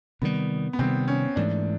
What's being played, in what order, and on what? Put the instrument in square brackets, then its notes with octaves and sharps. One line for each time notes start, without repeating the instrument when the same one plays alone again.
[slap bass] C3 D#3 G3 [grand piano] B3
[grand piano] B3
[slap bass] C3 D#3 G3 [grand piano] C4
[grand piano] C#4
[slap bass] G#2 E3 A3 [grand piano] D4